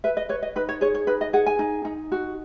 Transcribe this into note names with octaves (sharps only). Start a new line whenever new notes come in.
B4 E5
D#5
B4 C#5
D#5
D#4 B4
C#5
G#4 C#5
C#5
D#4 B4
D#5
G#4 F#5
G#5
D#4
D#4
F#4